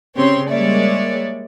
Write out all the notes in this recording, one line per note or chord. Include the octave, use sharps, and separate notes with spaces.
C#3 C4 G4 C#5 C6
G3 G#3 A#3 C#5 D5 E5